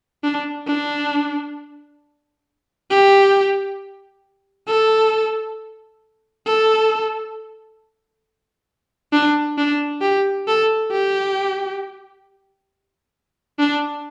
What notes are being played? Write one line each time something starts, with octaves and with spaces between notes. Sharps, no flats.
D4
D4
G4
A4
A4
D4
D4
G4
A4
G4
D4